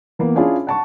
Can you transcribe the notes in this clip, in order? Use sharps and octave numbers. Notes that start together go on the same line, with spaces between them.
E3 A#3 B3
C#4 D4 E4 F4 G#4
F#5 A5 C#6